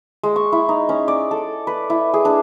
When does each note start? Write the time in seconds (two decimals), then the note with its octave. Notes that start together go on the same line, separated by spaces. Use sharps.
0.23 G#3
0.36 C#6
0.52 E4
0.69 D#4
0.89 C#4
1.08 D5
1.31 A4
1.67 B4
1.90 E4
2.14 G#4
2.25 D4